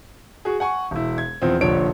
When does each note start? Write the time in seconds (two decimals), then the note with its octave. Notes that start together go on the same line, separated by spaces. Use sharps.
0.45 F#4 G#4
0.60 F#5 G#5 C#6
0.91 E1 E4
1.18 G#6
1.42 E2 F3 C4
1.61 F1 A#1 D3 F3 C#5 D7